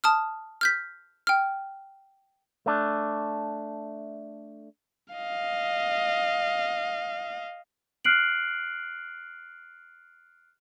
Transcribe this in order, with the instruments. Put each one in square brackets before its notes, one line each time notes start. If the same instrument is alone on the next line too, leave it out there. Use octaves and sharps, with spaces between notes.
[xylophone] A5 D#6 F6
F6 G6 B6
G5 F6
[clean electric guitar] A3 D4
[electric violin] D#5 F5
[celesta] F6 F#6 C7 D7 F#7